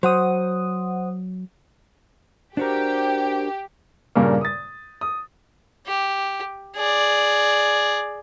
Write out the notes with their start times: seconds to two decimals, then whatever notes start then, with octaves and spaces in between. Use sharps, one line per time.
0.03 F#3 C5 F#5 D#6
2.57 D4 F#4 G4 A#4 C5
4.15 G2 A#2 C#3 A#3
4.41 D#6 A6
5.01 D#6
5.87 G4
6.77 G#4 D5